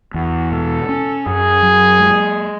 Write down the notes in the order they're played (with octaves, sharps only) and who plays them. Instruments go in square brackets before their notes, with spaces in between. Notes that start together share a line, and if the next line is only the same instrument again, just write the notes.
[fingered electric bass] E2 [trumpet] F#4
[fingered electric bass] B2 [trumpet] A4
[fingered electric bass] C#4
[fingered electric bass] F#2 [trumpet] G#4
[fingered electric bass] F#3
G#3